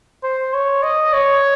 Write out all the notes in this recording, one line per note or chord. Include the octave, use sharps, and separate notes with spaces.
C5
C#5
D#5
C#5